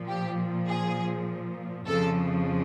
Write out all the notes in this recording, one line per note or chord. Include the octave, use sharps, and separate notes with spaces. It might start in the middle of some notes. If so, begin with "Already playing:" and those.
Already playing: A#2 F3
G4
G#4
F2 C#3 F3 A4